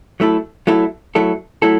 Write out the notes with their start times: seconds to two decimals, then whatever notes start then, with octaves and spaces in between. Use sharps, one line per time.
0.20 F#3 A3 E4 A4
0.67 F#3 A3 E4 A4
1.15 F#3 A3 E4 A4
1.62 F#3 A3 E4 A4